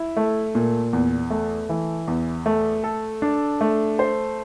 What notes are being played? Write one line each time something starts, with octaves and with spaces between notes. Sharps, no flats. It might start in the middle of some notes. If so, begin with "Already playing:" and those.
Already playing: E4
A3
A#2
E2
A3
E3
E2
A3
A4
D4
A3
C5